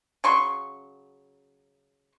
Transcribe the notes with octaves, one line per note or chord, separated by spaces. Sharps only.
C#3 F#3 C6 C#6